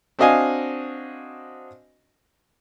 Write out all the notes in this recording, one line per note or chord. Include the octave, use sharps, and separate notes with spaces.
C4 D4 F#4 D#5 F5 G#5